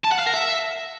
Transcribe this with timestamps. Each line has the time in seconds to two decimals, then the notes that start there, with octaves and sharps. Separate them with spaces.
0.04 A5
0.11 F#5
0.19 F5
0.26 A#4
0.34 E5